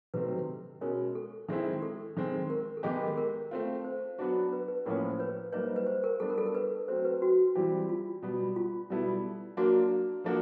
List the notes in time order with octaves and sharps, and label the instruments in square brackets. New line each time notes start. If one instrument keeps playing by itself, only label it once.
[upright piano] C3 D#3 F#3 A3 C4 [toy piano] B4
[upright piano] B2 G#3 C#4 [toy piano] A#4
[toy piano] A4
[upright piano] D#3 G#3 C4 E4
[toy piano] A4
[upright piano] D#3 G#3 C4
[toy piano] A#4
A4
[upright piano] D#3 G#3 B3 D#4 G4 [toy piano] G#4
[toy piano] A#4
A#4
[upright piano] A3 C4 F4
[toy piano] C5
[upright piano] F#3 B3 D4 F#4
[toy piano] B4
B4
[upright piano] A2 F3 A#3 C#4 [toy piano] A#4
[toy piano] C5
B4 C#5
[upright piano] G3 A#3 D#4 [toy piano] B4 C#5
[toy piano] C5
B4
C5
A#4
[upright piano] G3 B3 D4 [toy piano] A4
[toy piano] A#4
A4
A#4
B4
[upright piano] F#3 A3 C4 [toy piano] C5
[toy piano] B4
F#4
[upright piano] E3 G3 C4 E4 G4
[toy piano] F4
[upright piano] B2 G3 B3
[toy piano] F4
[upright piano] B2 G3 B3 E4 A4
[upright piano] F#3 A#3 D4 [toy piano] F#4
[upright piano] F3 A#3 D4 F#4 [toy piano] A4